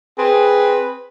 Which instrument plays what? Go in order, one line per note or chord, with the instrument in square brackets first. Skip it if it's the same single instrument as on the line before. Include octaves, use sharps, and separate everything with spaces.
[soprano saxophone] C4 [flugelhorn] G#4 [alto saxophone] B4